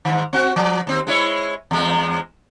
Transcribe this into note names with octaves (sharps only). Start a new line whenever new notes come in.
G#2 D#3
C4 F#4
F3
D#2 C4
G#3 E4 C#5
E2 G#3